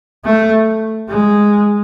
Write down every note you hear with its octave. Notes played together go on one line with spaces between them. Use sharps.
A3
G#3